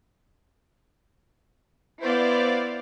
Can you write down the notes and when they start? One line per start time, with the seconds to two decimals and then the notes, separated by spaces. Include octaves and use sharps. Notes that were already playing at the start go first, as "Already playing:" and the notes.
2.02 B3 E4 C5 D5 F5